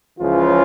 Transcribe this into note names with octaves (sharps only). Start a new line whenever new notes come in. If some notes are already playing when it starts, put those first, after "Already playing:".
C#2 C#3 E3 F3 F4